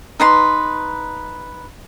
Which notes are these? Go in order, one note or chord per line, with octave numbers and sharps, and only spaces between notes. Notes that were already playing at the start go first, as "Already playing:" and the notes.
D#4 B4 C6